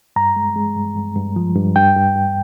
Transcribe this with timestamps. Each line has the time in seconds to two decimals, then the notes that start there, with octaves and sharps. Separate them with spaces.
0.16 G2 A#5
0.36 G#3
0.56 G#3
0.76 G2
0.96 G2
1.16 G2
1.36 F3
1.56 G2
1.76 G2 G5
1.96 G2
2.16 G2